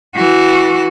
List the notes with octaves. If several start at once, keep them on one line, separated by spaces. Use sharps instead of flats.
E3 F#4